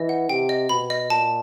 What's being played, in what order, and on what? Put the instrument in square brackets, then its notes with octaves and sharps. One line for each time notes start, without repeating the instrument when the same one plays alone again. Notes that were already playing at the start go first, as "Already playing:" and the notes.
Already playing: [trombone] E3 [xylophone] D#5
[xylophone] F#5
[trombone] C3 [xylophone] G5
[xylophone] D#5
[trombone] B2 [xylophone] B5
[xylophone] D#5
[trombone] A#2 [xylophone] A5